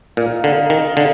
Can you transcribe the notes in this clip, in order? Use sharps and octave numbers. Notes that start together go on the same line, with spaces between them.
A#2 D#4 A#4 F5
D3
D#3
D3